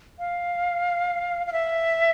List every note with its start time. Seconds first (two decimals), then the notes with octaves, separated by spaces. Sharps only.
0.19 F5
1.47 F5
1.52 E5